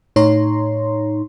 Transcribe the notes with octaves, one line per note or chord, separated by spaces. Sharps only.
A2 D#4 C#5 A#5 C6